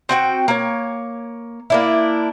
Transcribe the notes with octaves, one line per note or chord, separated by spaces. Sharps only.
C4 F#4 G5
A#3 C#5
A#3 D4 E4